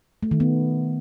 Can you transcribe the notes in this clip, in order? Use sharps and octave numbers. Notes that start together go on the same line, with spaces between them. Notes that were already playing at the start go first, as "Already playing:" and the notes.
A3
D#3
B3